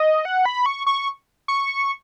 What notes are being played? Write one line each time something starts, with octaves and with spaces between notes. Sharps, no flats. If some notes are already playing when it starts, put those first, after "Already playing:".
Already playing: D#5
F#5
B5
C#6
C#6
C#6